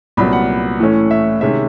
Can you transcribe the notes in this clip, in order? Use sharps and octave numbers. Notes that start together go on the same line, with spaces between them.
C2 A#2 F#3 B3 B5
F#5
A2 E3 A3 C#4
E5
C3 D#3 G#3 C#4 E5